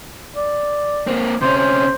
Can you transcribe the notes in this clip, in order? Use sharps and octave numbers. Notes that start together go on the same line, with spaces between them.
D5
A#3 C4
C3 C#4 C5
C5